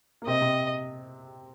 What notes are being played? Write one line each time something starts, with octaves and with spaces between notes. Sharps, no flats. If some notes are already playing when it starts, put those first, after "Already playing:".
A#3
C3 C4 D#5
C3 C4